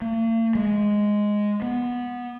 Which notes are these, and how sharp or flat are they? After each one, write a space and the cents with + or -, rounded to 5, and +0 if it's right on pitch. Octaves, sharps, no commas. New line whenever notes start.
A#3 -45
G#3 +0
B3 -15